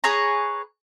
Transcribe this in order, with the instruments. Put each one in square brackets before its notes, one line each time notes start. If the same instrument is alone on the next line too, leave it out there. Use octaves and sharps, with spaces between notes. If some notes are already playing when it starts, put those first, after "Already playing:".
[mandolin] G#4 B4 C#5 A#5